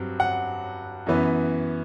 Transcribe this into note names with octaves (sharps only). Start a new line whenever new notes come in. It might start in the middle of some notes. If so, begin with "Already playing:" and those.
Already playing: G2 F#3 C4
F#5
F#2 E3 B3